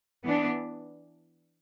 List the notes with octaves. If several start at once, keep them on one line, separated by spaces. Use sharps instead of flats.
E3 B3 D4